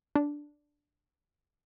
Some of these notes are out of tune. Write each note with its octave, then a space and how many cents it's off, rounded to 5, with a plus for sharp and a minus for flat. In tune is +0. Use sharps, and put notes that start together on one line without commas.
D4 +0